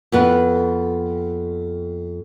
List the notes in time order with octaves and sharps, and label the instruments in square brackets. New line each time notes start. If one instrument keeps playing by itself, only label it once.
[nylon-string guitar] F2 B3 B4